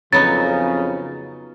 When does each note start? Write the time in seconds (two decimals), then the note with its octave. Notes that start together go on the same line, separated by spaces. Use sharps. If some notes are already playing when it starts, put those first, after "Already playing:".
0.13 F2 C#3 F#3 B3 D#4 A6